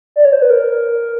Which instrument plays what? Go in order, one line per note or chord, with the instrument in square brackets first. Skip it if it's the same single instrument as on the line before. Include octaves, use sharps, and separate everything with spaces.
[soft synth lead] D5
C#5
C5
B4
A#4